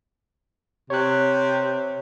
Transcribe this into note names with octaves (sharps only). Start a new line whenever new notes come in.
C3 C#5 F#6